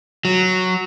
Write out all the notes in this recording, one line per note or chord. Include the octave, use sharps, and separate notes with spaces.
F#3